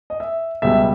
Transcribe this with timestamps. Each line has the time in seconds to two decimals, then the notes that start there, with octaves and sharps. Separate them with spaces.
0.10 D#5
0.20 E5
0.62 C#2 B2 G3 E5